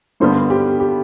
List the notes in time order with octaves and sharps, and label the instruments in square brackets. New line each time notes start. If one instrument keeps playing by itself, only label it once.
[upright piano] G2 D3 G3 B3 [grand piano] C5
[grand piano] G4
G4